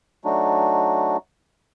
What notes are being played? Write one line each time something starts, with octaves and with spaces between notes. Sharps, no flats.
F#3 A3 D4 D#4 F#4